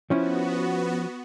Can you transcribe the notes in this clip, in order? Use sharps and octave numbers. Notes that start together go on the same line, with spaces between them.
F3 B3 C#4 E4 F#4